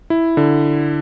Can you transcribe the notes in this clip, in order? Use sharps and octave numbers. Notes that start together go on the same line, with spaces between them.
E4
D3